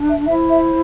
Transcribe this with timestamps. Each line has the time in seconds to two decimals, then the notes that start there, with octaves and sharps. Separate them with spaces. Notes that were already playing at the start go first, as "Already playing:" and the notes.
Already playing: D4
0.09 E5
0.26 E4 C5 E5
0.50 E5